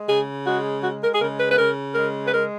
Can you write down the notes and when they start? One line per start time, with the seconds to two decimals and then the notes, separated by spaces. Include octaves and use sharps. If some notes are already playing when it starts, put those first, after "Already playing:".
Already playing: G#3
0.08 C#3 G#4
0.45 G#3 F#4
0.82 G#3 F#4
1.02 A#4
1.14 G#4
1.20 C#3 A#4
1.40 B4
1.51 B4
1.57 C#3 A#4
1.95 G#3 A#4
2.26 B4
2.32 G#3 A#4